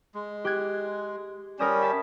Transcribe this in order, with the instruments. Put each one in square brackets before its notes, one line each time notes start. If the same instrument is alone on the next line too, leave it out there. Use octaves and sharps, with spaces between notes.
[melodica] G#3
[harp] G4 F#6 G#6
[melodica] G3 C#4 [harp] A#4 D#6 E7
[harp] E5 A5 B6